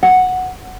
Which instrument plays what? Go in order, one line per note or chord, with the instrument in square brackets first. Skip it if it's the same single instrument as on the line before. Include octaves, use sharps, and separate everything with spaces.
[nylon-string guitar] F#5